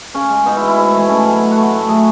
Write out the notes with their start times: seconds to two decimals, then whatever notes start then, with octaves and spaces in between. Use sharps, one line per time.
0.14 C#3 C#4
0.30 G#3
0.46 B2 D#4
0.56 E4
0.61 G#3
0.68 E4
0.78 G#2
0.93 E3 A3
1.09 G#2 C#4
1.26 F#3 A3
1.41 B2
1.51 F#4
1.57 A3
1.63 F#4
1.74 A2
1.88 F#3 A3 G#4